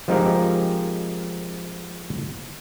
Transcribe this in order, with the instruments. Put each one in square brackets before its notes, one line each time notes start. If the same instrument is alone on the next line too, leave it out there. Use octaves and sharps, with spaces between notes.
[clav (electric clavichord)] F3 G#3 C4 D#4 G4 A#4